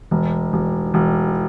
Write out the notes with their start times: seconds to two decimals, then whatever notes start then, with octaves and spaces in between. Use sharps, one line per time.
0.11 E1
0.53 E1
0.94 E1